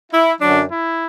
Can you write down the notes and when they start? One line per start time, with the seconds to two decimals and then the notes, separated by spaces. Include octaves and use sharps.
0.12 E4
0.41 F#2 D3 F#3 D4
0.70 E4